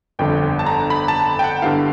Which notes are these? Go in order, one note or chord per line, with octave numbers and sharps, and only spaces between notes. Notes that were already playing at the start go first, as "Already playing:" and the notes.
G1 F2 D3 G5
A5
A#5
B5
A5
G5
F#5
G2 D3 G3 B3 E4 F5